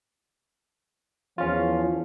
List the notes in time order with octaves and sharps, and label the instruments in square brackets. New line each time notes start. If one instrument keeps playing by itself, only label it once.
[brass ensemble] E2 F3 [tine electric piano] C#4 F4